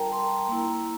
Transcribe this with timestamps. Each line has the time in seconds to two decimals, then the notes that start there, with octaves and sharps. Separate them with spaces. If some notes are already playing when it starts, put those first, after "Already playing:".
Already playing: G3 D4 F4 A#4 G5 A5 A#5
0.12 C6
0.21 A#5
0.29 C6
0.48 A#3 E4 A#5